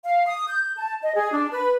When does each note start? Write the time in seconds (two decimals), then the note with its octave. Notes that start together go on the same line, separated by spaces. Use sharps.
0.05 F5
0.27 D#6
0.48 G6
0.76 A5
1.02 D#5
1.14 G#4
1.32 D4
1.52 B4